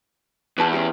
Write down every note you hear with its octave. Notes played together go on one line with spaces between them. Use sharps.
E2 B4 A5
C#4 G4